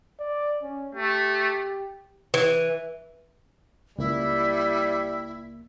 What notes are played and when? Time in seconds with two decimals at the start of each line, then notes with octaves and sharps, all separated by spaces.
0.19 D5
0.63 C#4
0.95 A3 G4
2.34 E3
3.98 C#2 G3 A#3 E4